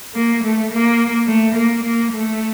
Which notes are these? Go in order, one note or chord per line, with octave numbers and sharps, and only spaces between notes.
A#3
A3
A#3
A3
A#3
A#3
A3